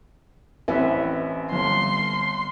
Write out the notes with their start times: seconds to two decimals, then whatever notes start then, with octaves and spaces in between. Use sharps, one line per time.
0.68 A1 C4 C#4 B4 E5
1.52 G1 C6